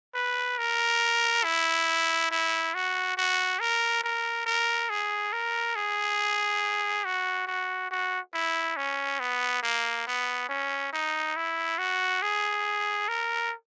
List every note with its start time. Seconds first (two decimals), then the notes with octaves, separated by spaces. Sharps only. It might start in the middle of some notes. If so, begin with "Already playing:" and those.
0.15 B4
0.58 A#4
1.44 E4
2.31 E4
2.74 F#4
3.17 F#4
3.60 A#4
4.04 A#4
4.46 A#4
4.90 G#4
5.33 A#4
5.76 G#4
7.05 F#4
7.47 F#4
7.91 F#4
8.34 E4
8.77 C#4
9.20 B3
9.63 A#3
10.07 B3
10.49 C#4
10.93 D#4
11.36 E4
11.78 F#4
12.22 G#4
13.08 A#4